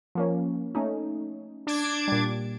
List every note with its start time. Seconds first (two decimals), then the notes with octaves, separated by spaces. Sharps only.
0.15 F3 A#3 C#4
0.75 A3 C#4 D#4
1.67 D4 D6 G#6
2.08 A#2 G3